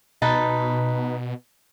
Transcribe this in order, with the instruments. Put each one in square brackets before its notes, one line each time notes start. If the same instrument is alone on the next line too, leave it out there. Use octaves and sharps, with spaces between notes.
[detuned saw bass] B2 [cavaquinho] D#4 B4 A5